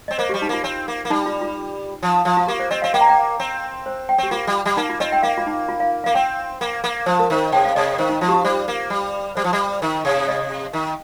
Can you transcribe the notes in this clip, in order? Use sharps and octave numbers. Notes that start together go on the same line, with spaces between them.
C4 D#5
A#3 C5
G3 G4
D#4
A#3 F4
C4
A#3
A#3
G3 D#4
F4
F4
F3
F3
F4
A#3 G4
C5
C4 D#5
C4 F5
A#3 G5
A#5
G5
C4
C5
G5
C4 G4
A#3 F4
G3
G3
A#3 D#4
F4
C4 D#5
G5
A#3 F5
F4
D#4
F4
F5
A#3 F5
C4 G5
A#3
A#3
F3 C5
A#4
D#3 C5
C3 G5
F5
C3 D#5
D#3 C5
D#4
F3 F4
G4
F4
G3 C5
A#3
G3
G3 C5
F3
G3
D#3
C3
D#5
D#3